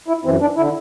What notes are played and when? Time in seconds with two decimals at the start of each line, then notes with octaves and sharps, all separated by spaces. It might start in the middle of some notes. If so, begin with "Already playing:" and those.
0.08 E4
0.25 F#2 E3 C4
0.41 D4
0.57 D3 E4